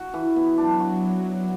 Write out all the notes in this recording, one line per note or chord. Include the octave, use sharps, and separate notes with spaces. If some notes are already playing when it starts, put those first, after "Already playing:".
Already playing: F#4
E3
B3
F#3 D4
F#4